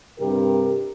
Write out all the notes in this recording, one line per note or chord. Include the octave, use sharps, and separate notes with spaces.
G2 C3 G4 A#4